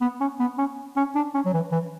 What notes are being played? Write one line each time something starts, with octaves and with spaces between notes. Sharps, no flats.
B3
C#4
B3
C#4
C#4
D4
C#4
F#3
E3
E3